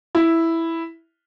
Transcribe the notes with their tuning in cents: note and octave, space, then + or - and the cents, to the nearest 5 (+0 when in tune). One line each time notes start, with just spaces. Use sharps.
E4 +0